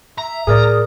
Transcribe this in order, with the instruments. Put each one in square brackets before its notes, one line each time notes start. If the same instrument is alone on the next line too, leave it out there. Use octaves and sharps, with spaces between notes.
[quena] E5 [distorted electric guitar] A#5
[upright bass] A2 [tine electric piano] G#4 A#4 D5 [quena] D#6